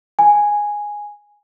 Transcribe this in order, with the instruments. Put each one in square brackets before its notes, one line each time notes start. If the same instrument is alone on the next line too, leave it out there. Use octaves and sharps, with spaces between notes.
[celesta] G#5